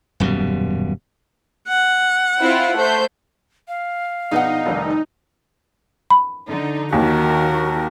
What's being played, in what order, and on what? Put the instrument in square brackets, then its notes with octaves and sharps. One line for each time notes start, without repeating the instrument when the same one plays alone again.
[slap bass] D#1 F#2 B2 G3
[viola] F#5
[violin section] C4 E4 F4
A3 C5 G6
[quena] F5
[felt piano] A#1 B2 [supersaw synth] D#4 [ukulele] G#4 B4 F#5
[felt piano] F1 C2 D#3
[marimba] B5
[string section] D3 D#4
[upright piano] D#2 [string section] D#3 [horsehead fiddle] F#4 A#4